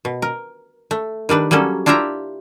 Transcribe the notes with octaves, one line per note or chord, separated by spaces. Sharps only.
B2
A#4
A3
D#3 G3 D4 B4
F#3 G3 A#3 C#4 A4
D4 E4 F4 G4 E5 A#5